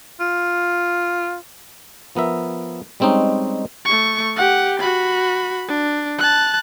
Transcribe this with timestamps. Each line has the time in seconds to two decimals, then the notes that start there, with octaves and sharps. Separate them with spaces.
0.20 F4
2.15 F3 B3 A#4 E5
3.00 G3 G#3 C4 C#4 D#4
3.85 A3 C#6
4.36 G4 F#5
4.80 F#4 B5
5.68 D4
6.18 A5 F#6